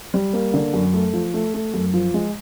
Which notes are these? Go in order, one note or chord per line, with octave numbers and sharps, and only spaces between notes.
G3
A#3
D3
F#2
A3
F3
A3
A3
F#2
F3
G#3